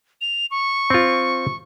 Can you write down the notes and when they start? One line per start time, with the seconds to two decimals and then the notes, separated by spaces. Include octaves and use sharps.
0.21 F7
0.51 C#6
0.90 C4 F4